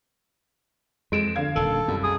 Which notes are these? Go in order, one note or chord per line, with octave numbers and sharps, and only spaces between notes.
F2 G#3 D7 E7
D3 F5 G#6
D#1 D#3 A4
C2 F#2
G#4 D#6